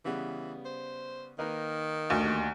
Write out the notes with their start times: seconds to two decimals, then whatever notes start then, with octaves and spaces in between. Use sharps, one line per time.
0.05 C#3 E3 G3 B3
0.65 C5
1.39 D#3 A#3 D#4 B4
2.10 D2
2.23 D#2